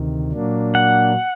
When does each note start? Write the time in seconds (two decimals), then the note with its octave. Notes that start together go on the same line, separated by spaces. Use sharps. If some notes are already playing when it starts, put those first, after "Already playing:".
Already playing: D2 C3 D#3
0.32 A#2 F#3 A#3 D4
0.75 F#5